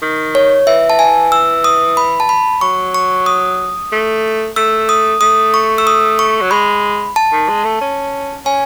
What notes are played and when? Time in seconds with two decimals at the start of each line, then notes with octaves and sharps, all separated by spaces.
0.02 D#3
0.35 C#5
0.67 E3 E5
0.90 A5
0.99 G#5
1.32 E6
1.64 D#6
1.97 B5
2.20 A5
2.29 B5
2.61 F#3 C#6
2.94 C#6
3.26 D#6
3.92 A3
4.56 A3 E6
4.89 D#6
5.21 A3 D#6
5.54 C#6
5.78 E6
5.87 D#6
6.19 C#6
6.41 F#3
6.51 G#3 B5
7.16 A5
7.32 D#3
7.49 G#3
7.65 A3
7.81 C#4
8.46 C#4 G#5